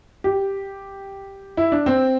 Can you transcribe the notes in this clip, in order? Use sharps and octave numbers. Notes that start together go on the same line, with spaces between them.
G4
E4
D4
C4